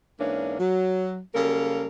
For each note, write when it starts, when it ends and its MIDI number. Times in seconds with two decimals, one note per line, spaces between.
0.19 0.56 44
0.19 0.56 52
0.19 0.56 58
0.19 0.56 61
0.19 0.56 62
0.59 1.19 54
1.34 1.87 49
1.34 1.87 54
1.34 1.87 55
1.34 1.87 58
1.34 1.87 69
1.34 1.87 70